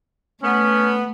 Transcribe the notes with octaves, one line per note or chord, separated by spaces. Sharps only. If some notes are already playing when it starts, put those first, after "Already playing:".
A3 B3 C#4